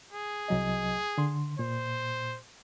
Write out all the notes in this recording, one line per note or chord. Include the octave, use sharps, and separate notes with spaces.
G#4
C2 F#3 D#5
D3 C6
A#2 C5